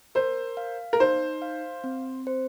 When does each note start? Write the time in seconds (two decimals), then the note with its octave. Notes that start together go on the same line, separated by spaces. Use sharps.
0.15 A#4 C5
0.57 F5
0.93 A#4
1.00 D#4 C5
1.42 F5
1.84 C4
2.27 C5